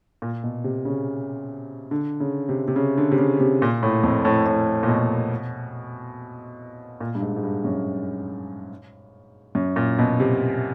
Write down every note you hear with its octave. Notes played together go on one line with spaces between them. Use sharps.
A#2
B2
C3
C#3
D3
C#3
C3
C3
C#3
D3
C3
C#3
C3
A#2
A2
F2
A2
A2
A#2
B2
A#2
G2
G#2
G#2
G2
F#2
F#2
A#2
B2
C3